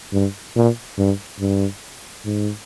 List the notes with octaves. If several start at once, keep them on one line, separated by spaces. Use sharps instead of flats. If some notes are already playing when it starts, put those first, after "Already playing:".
G2
A#2
G2
G2
G#2